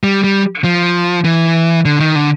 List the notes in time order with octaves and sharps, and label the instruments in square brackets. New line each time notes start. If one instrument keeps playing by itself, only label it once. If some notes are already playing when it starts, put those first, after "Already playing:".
[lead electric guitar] G3
G3
F3
E3
D3
D#3
D3